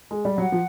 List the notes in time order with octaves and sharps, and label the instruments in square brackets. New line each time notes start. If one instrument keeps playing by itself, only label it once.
[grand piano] G#3
G3
[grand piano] F#3 [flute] F#5
[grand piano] F3